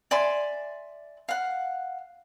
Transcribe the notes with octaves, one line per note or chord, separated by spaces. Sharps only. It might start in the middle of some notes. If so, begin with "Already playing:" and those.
D5 E5 G#5 C6
F5 F#5